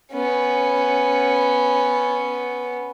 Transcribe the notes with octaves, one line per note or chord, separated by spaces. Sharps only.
B3 C#4